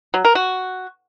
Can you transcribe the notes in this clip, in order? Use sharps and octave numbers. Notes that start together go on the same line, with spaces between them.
F#3
A#4
F#4